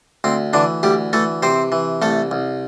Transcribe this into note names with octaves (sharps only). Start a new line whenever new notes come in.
D2 C4
D3 E3 D4
D2 G3 G4
E3 A3 A4
C3 C4 C5
E3
C2 A3 A4
C2